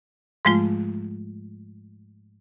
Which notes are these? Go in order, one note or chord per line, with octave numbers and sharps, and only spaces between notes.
G#2 F3 G#3 A3 F4